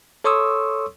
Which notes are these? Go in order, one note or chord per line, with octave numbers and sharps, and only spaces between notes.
A4 C#5 C6 C#6 D#6 E6